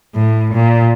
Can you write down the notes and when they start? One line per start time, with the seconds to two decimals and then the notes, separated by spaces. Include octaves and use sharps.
0.15 A2
0.54 A#2